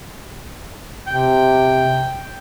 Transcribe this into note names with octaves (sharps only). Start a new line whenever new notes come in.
C3 G5